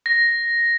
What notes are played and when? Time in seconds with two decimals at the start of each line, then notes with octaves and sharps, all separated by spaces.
0.06 A#6